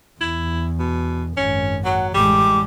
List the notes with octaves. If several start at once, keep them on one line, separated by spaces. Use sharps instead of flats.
E2 E4
B2
G#1 F#2 C#4
F#3 F#5
A1 G3 G#3 D6